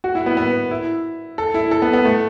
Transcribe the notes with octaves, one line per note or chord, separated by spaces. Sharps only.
F#4
E4
B3
B3
E4
A4
E4
A4
B3
B3
A3